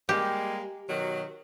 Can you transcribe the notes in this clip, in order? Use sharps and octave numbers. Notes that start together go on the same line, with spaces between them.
G3 G#3 A#3 G4
B2 D#3 F#3